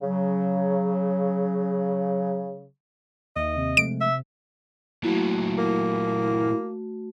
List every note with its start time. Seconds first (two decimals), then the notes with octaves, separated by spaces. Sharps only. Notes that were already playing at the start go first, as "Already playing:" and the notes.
0.02 C#3 F#3
3.36 D#2 D#3 D#5 E5
3.56 C3
3.77 F3 G#3 A3 D7
4.01 E5
5.04 A#2 F#3 A3 E4 F#4
5.58 A#3